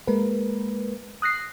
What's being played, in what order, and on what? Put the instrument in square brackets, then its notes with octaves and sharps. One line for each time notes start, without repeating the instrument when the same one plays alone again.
[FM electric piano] G#3 A#3 A#4 B4
D#6 F#6 A#6 C7